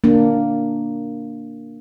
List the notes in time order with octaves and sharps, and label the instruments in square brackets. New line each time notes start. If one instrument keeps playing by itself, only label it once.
[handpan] A#3 D4